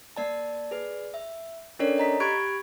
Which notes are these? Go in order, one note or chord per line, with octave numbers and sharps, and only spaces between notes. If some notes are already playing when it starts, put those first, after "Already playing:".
A#3 D5 A5
G#4 B4 D5
E5
C#4 D4 A4 A#4 C#5 D5
D#5 A#5 B6
G4 B5 C#6 F#6 G#6 D7